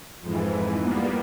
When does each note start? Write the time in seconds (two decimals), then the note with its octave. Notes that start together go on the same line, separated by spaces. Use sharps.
0.21 F2 G#2 E3
0.81 G3 A#3 B3